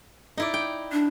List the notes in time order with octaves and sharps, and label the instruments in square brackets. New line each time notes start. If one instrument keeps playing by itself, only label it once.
[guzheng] D#4 E4 D5
G5
[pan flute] D4